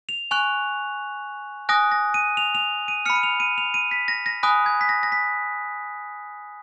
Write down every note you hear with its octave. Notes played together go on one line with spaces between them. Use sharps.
F7
G#5 C#6 F#6 F7
G#5 D#6 F#6 A#6
A#6
D#7
F7
F7
D#7
B5 F6 C#7
D#7
F7
D#7
F7
D#7
B6
A#6
A#6
G#5 B5 D#6 F#6
G#6
B6
A#6
A#6
B6